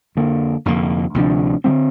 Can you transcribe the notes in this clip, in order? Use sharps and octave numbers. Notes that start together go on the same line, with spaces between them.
F2 D3 A#3
F1 F2 D3 A#3
D2 C3 F3 D4
D3 G3 C4